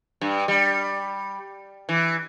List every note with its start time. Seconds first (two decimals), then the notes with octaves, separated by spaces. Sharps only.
0.21 G2
0.48 G3
1.89 E3